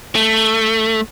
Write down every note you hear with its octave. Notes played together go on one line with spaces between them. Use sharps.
A3